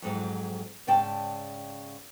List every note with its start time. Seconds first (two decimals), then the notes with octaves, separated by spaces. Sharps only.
0.02 F2 G#2 F#3
0.87 G#2 C#3 D5 G5 A5